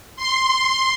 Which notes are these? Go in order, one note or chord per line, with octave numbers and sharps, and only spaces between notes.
C6